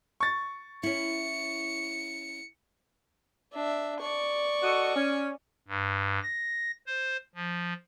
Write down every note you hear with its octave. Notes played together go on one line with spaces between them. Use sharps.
C#6 A6
C#4 E4 C#7
D4 E5
D5 C#6
F#4 A4 D#5
C#4
G2
A#6
C5
F3